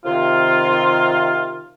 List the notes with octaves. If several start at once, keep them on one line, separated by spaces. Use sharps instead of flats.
C3 D#3 F4